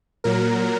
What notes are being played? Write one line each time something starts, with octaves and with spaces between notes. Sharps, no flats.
A#2 F#3 A#4